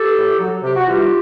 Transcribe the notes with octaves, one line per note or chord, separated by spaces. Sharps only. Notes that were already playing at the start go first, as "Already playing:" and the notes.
Already playing: G4 A4
A2
F#3
C3 G4
F#4
E3 G3 F4 G4